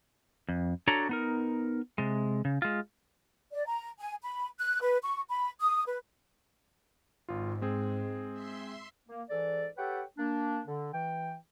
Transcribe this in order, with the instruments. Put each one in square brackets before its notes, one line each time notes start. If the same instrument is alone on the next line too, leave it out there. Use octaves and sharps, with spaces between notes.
[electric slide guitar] F2
D4 F#4 A4 C#5 A#5
B3 D#4 A#4
C3 G#3
C#3
G#3 F4
[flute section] D5
A#5
G#5
B5
F#6
B4
C#6
B5
D#6
B4
[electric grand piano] G#1 F4 [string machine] G#2
[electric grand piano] G#3 C4 G#4
[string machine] E5 C6
[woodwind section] A#3
G#2 E3 A4 D5
G4 A4 B4 C#5 F#5 G5
A#3 D4
D3
E3 G5